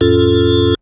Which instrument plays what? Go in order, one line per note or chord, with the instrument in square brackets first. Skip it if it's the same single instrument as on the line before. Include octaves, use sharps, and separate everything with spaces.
[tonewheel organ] F2 A2 C#4 F4 A4